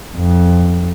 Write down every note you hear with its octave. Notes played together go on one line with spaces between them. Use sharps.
F2